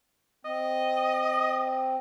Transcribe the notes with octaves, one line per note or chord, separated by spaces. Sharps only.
C4 D#5